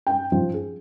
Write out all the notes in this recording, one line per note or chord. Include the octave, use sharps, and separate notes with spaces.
G5
F3
G#4